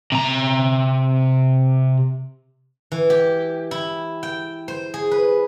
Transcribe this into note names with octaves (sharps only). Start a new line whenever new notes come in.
C3 A#5
E3
G4
E4
G5
C5
G#4
B4